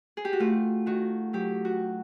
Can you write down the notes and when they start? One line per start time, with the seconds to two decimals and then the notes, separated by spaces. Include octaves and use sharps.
0.17 G#4
0.25 G4
0.33 F#4
0.40 A3 F4
0.86 D#3 F#4
1.33 F#3 G4
1.65 F#4